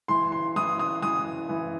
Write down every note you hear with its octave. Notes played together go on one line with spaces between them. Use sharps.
E3 C6
C6
E3 D#6
D#6
E3 D#6
E3